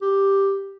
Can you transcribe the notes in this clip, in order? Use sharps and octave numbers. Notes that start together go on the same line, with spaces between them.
G4